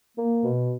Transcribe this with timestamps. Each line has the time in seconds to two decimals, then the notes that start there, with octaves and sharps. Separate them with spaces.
0.17 A#3
0.42 B2